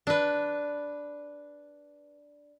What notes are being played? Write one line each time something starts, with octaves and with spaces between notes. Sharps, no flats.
D4 B4